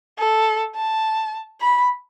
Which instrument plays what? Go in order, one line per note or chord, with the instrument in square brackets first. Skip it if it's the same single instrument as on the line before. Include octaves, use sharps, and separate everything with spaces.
[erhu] A4
A5
B5